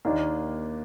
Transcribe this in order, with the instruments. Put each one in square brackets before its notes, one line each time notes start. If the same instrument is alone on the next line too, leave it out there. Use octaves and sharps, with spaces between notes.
[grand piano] D#2 D#3 A#3 D4